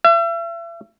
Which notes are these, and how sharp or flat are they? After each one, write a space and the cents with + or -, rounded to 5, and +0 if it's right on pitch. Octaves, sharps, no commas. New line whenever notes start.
E5 +40